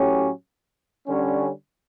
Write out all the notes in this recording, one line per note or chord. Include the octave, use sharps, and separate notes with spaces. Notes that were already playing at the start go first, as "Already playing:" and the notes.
Already playing: A2 F#3 C#4 G4
D3 G3 C#4